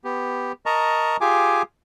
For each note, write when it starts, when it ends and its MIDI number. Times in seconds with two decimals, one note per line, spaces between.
0.04 0.52 59
0.04 0.52 67
0.66 1.17 70
0.66 1.17 75
0.66 1.17 81
0.66 1.17 82
0.66 1.17 85
1.21 1.62 65
1.21 1.62 67
1.21 1.62 68
1.21 1.62 80
1.21 1.62 86